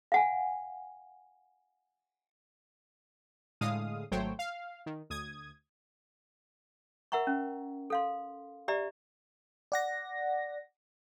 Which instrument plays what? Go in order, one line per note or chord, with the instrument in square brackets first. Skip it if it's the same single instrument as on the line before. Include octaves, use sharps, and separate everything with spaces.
[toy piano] F5 F#5 G#5
[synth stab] A2 D3 G#3 F5 D#6
G#1 F#3 A3 C5 C#5 G5
F5
D#3
D2 D#6 G#6
[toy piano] A#4 E5 F#5 A#5 C#6
C#4
A4 F5 C6
G4 D5 E5 A#5
[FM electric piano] D5 F#5 A#6